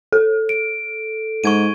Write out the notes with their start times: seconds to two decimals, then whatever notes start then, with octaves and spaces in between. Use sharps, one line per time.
0.12 A4
0.49 D7
1.44 G#2 C#6 G#6 D#7